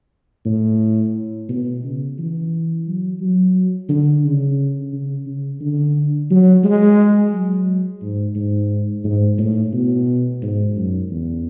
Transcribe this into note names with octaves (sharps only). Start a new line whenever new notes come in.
A2
B2
C#3
E3
F#3
F#3
D3
C#3
C#3
C#3
D3
F#3
G#3
F#3
G#2
G#2
G#2
A2
B2
G#2
F#2
E2